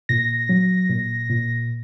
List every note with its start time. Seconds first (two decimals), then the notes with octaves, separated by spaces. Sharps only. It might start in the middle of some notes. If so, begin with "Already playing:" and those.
0.09 A#2 A#6
0.49 F#3
0.89 A#2
1.30 A#2